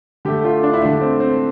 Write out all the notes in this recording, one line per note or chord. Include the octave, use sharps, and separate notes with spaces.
D3 A3 G4
F4
D4
E4
D3 A3 D4
C4
C4